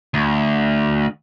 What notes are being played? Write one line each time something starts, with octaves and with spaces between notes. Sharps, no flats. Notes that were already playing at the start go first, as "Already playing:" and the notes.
D2